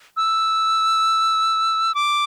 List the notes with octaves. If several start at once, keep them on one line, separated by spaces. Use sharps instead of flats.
E6
D6